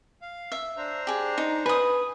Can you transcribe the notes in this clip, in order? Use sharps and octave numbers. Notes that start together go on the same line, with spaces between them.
F5
E5
D4 C5 A#5
G4 G#4
D#4
B4 G#5 D#6